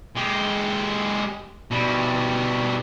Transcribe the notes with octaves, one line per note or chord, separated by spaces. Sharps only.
G#3 G4
B2 G3